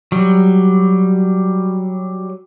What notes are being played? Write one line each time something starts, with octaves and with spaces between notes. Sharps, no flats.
F#3 G3